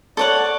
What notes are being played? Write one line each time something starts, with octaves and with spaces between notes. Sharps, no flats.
A4 C#5 D5 F#5 C#6